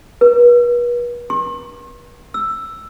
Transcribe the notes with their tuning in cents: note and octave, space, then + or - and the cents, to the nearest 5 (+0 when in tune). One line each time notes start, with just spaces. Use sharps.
B4 -40
C6 +45
E6 +5